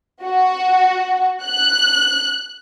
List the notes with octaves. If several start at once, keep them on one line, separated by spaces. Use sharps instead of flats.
F#4
F#6